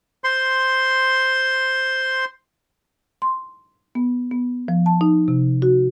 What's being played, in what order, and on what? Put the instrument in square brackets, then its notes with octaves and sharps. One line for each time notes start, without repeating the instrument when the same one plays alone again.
[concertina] C5 C6
[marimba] C6
B3
B3
F3
A5
D#4
C3
F#4